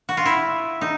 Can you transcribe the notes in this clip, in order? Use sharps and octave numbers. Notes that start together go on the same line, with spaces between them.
F#4
F4
E4
D#4